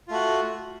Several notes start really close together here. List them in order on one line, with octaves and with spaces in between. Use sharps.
F4 A3 F#4